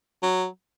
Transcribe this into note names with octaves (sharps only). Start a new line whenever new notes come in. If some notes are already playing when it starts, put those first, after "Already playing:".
F#3